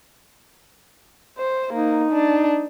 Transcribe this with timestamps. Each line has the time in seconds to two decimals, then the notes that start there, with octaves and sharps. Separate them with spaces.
1.38 C5
1.74 A#3 D#4
2.12 D4